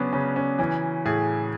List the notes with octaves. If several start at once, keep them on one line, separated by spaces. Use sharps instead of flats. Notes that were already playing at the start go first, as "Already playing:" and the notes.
Already playing: C#3 F#3 B3 C#4 D4 F#4
C#3 C#4
C#4
E3 C#4
A2 G#4